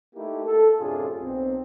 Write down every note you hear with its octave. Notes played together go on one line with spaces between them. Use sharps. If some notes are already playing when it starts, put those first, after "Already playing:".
A3 A#3 D#4 E4 G4
A4
F#2 A2 C3 D4 F4 G#4
B1 C4